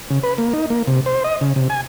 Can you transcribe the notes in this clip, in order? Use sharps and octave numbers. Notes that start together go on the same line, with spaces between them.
C#3
B4
A#3
D#4
A#3
C3
C5
D#5
C#3
C3
G#5